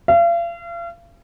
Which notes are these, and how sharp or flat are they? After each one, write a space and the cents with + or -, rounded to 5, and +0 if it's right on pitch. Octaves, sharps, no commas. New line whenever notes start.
F5 -40